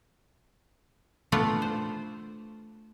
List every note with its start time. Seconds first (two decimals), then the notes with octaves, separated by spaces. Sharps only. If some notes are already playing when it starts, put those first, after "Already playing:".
1.32 A3 B3 D4 F4 D5
1.62 C5